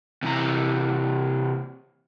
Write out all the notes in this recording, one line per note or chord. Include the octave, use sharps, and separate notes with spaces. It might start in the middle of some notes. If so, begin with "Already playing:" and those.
C3 E3 E4 A#5